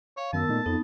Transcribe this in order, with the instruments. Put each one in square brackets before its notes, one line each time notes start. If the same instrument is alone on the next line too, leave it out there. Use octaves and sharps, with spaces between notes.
[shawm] C#5 [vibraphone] F5
[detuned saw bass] F#2 [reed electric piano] D#3 [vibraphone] B3 A#4 E6 [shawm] A5
[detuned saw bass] A#2 [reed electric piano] A3 D#4
[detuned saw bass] F2 [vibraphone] B3 D#4 [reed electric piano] A4